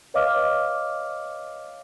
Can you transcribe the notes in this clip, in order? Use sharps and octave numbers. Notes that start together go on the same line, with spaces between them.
B4 C#5 D#5 F5 D6 F6